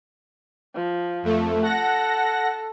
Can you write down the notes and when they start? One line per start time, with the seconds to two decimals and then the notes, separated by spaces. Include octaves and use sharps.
0.75 F3
1.23 F2 A3
1.62 A4 F#5 A#6